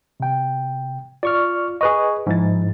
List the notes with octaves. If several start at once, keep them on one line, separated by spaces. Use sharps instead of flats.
C3 G5
F4 D5 C#6 F6
G#4 B4 D#5 C#6
G#2 F3 E4 A6